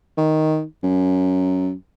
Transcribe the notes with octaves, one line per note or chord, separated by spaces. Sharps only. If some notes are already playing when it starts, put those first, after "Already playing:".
D#3
F#2